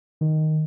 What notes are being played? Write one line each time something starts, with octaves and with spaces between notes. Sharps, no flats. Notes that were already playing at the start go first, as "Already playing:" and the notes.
D#3